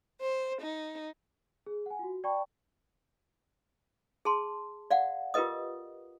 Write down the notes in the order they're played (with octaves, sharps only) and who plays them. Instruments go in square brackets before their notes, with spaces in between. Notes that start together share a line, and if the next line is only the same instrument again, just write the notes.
[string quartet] C5
D#4
[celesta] G#4
F#5 G#5
F4 F#4
D5 G5 A5 B5 C#6
[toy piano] G#4 A5 C6
D5 F5 F#5
F4 G4 A#4 B4 D#5 D#6